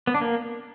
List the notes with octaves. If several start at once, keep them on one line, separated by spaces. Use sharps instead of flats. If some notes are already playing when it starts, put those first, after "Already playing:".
B3
D4
A#3